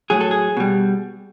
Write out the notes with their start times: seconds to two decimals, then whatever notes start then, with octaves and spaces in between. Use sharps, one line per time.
0.10 A2 F#3 G#4
0.21 A4
0.31 G#4
0.57 B2 G3